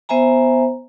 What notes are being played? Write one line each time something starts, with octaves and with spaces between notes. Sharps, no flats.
B3 C5 E5 G#5 A#5